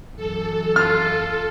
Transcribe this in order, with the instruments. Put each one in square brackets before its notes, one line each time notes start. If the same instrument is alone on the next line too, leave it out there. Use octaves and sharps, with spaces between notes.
[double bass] F#2 E3 [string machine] A4
[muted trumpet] F4 [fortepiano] F6